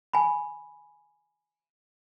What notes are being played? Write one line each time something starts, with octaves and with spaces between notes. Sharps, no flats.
G#5 B5